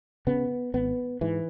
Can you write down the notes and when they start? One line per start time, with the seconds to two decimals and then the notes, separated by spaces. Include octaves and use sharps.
0.27 C#3 B3
0.74 G#1 B3
1.21 G#2 E3